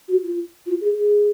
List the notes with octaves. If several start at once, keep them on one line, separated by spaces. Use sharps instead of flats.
F#4
F4
F4
G#4
G#4